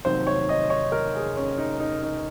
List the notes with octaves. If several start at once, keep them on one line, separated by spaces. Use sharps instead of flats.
F1 D#2 D#3 F#3 C4 C5
C#5
D#5
C#5
A#4
G#4
C#4
D#4
D#4
D#4